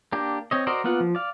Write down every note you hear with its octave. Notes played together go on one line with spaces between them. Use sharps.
A#3 D4 G4
C4 C#5 D#5
F#4 A#4 C5 D5 D#5
A#3 B3 F4 F#5
F3
D5 F5